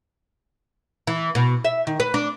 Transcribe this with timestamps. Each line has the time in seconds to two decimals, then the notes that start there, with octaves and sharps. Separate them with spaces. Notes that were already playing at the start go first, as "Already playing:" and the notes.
1.07 E3
1.35 B2
1.65 E5
1.87 D#3
2.00 B4
2.14 D4